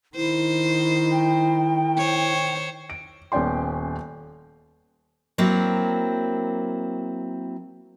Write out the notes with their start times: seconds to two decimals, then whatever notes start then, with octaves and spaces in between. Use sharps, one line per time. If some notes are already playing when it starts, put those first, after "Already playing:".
0.16 D#3 E4 C5
1.12 G5
1.97 C5 C#5
2.90 D7
3.32 D#1 B3 C#4 D5 G5 C6
5.38 F#3 A#3 C4 E4